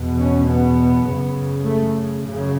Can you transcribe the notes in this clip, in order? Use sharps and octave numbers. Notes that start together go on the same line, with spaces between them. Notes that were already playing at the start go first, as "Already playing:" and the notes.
Already playing: E2 B2
C#4
B3
F#2 C#3
A3
F#2 C#3